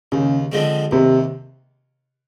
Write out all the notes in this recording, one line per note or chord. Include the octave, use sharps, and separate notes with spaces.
D#2 C#3
D3 F3 G#3 C4
D#2 C3